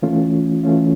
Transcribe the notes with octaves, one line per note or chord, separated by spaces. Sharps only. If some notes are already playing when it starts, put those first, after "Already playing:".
E3 A3 C#4 F4
E3 A3 C#4 F4